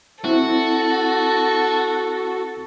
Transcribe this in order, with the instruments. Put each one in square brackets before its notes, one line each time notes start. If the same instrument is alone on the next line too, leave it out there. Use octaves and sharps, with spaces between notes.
[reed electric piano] C4 E4 [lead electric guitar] F#4 [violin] A4